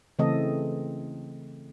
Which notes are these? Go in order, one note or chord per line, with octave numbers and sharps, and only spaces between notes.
C#3 E3 A3 C4 A4 D#5